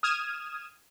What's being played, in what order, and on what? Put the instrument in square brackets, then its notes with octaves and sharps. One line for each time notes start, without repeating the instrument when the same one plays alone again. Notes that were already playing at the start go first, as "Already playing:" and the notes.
[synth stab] D#6 F6 G#6 D#7 E7